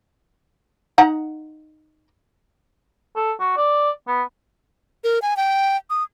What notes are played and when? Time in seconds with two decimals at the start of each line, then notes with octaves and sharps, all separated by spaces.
0.98 D#4 F#5 A#5
3.16 A4
3.40 F#4
3.57 D5
4.07 B3
5.04 A#4
5.22 G#5
5.37 G5
5.90 D#6